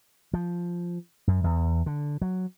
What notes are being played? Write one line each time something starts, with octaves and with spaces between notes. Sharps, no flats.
F3
F#2
E2
D3
F#3